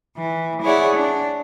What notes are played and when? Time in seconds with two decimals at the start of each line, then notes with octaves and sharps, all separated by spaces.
0.16 E3
0.63 E4 G#4 C#5 D5 F#5
0.96 D4